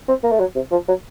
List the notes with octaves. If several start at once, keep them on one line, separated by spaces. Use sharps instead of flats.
C4
A#3
A3
F#3
C3
F3
F#3